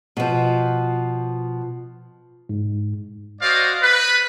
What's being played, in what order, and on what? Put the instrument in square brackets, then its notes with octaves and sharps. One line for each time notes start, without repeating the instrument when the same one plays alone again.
[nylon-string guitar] B2 F3
[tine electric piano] G#2
[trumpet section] F#4 C5 D5 D#5 F5
B4